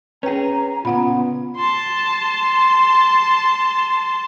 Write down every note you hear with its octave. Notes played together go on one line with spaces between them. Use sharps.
C#4 G#4 B4 G5 A#5
A#2 C#3 B3 F4 F#5 B5
A5 C6